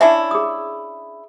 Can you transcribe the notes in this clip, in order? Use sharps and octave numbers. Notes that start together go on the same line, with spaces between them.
C#4 D4 E4 E5
G#4 D#6